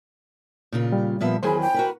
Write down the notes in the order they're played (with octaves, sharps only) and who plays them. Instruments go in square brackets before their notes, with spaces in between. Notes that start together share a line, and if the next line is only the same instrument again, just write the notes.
[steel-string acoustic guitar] A#2 C#3 F4
[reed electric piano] G3
[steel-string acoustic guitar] A#2 F3 E5 [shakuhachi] B3
[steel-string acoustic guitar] E2 D#3 F#3 [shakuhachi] G#4 [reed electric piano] C5 G#5 B5
[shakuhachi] G5
[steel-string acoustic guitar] F#4 A#4 B4